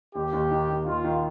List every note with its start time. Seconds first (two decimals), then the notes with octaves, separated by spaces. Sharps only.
0.15 D#2 G4
0.33 D#2
0.51 D#3
0.69 D#2
0.86 D#2 F4
1.04 D#3